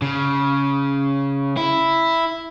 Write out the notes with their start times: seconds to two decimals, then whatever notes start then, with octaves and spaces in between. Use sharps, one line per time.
0.02 C#3
1.57 E4